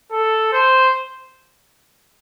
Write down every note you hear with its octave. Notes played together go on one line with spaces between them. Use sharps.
A4
C5